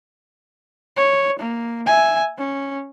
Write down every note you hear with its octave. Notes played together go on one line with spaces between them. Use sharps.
C#5
A#3
E5 G#5
C#4